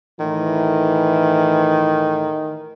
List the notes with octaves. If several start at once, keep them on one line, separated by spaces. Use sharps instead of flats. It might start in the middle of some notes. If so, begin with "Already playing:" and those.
A2 D#3 E3